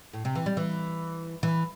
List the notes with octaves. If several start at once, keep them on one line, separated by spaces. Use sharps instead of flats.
A2
C3
E3
G3
E3
E3